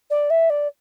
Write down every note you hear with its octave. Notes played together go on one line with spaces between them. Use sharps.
D5
E5
D5